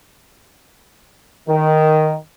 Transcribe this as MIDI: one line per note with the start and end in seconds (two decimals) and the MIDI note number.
1.49 2.16 51